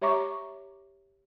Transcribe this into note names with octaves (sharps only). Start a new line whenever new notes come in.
G4 C#5 E5 A#5 C#6 D6